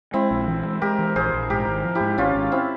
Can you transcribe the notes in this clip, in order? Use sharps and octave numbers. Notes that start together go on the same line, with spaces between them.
G#3 C4 E4
A#1
E3
G#3
G#3 G4 A#4
E3
A#1 G#4 C5
A#1
G#2 G4 A#4
G#1
F3
E4 G4
G#2
G#1 C#4 F4
G#1
C4 E4